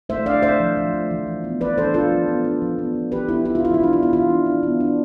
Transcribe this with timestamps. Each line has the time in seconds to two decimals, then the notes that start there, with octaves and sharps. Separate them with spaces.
0.09 A3 C5 E5
0.26 D4 D5 F5
0.43 A3 C5 E5
0.60 F3
0.77 F3
0.93 A3
1.11 E3
1.27 E3
1.44 B3
1.61 E3 B4 D5
1.78 D4 A4 C5
1.94 D4 F4 A4
2.11 F3
2.28 B3
2.45 D4
2.62 F3
2.79 B3
2.95 F3
3.12 E3 G4 B4
3.29 B3 E4
3.45 E3 E4
3.55 F4
3.63 E3 E4
3.74 F4
3.80 D4 E4
3.93 B3 F4
4.03 E4
4.13 E3 F4
4.30 D4
4.46 D4
4.63 B3
4.80 D4